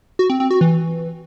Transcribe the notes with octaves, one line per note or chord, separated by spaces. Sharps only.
F#4
C4
C4
F#4
E3